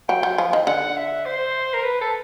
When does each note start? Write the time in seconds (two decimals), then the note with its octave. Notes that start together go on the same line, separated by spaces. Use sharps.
0.09 F#3 G5
0.23 F#3
0.38 F3
0.53 D#3
0.67 D3 F#5
0.96 E5
1.25 C5
1.74 A#4
1.84 B4
2.01 A4